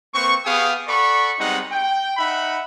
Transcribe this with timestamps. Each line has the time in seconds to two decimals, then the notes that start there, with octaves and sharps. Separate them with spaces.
0.15 A#3 C4 B4 C#6
0.45 B3 G4 G#4 F5 G5 D#6
0.88 A4 D5 F#5 B5 C#6
1.40 G3 G#3 B3 C4 D#4 F#5
1.70 G5
2.17 D#4 E5 F#5 B5